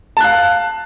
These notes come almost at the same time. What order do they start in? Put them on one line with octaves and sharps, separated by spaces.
A5 F#6 F5